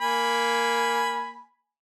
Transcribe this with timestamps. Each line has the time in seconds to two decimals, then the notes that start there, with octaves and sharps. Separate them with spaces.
0.01 A#3 G#5 B5